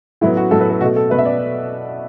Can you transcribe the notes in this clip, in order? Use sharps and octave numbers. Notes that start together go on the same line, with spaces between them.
A2 F#3 B3 E4
F#4
A2 F#3 B3 A4
B4
A4
B2 A3 F#4
A4
B2 A3 B4
E5
D5